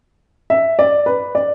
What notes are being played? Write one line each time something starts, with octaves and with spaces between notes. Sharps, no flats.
E5
D5
B4
D5